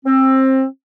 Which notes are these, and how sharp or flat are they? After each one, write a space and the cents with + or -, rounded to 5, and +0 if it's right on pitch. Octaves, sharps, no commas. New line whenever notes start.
C4 +20